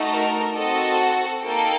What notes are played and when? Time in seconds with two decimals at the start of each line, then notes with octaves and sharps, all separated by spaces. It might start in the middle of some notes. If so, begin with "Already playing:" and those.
Already playing: A3 D#4 F#4 A4
0.13 A#4
0.56 C4 F#4 A4 D#5
1.00 F#5
1.43 A#3 D#4 A4 G5